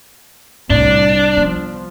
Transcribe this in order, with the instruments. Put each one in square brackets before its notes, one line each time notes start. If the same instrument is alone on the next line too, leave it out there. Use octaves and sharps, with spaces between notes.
[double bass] C2 [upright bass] A2 [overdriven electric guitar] D4
[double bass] F3 [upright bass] B3